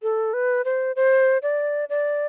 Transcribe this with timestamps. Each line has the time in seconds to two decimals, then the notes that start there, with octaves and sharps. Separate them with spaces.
0.03 A4
0.34 B4
0.65 C5
0.96 C5
1.43 D5
1.90 D5